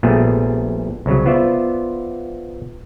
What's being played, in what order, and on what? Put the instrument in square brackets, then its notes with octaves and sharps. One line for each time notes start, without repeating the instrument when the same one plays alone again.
[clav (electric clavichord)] A#1 A#2 G3 A3 B3 G#4
C2 C#3 F#3
B3 F4 C5 D5 E5